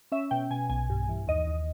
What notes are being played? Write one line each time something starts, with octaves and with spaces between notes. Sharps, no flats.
C#4 E5
B2 G5
B2 G#5
B1 G#5
G2
E3
D#2 D#5
D#2